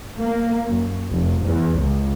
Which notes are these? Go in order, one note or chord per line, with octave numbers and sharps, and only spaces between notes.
A#3
F#2
F1
E2
C#2